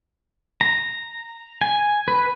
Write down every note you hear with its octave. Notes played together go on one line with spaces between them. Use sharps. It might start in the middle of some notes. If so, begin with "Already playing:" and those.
A#5
G#5
B4